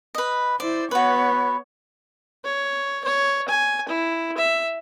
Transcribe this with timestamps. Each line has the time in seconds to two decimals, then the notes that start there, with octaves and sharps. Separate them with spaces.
0.15 B4 D#5
0.60 E4 C5 D5
0.91 B3 F#4 B4 C#5
2.45 C#5
3.05 C#5
3.49 G#5
3.89 E4
4.37 E5